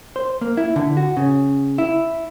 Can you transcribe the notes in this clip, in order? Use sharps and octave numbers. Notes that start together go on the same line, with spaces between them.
C5
A#3
E4
D3
F#4
C#3
E4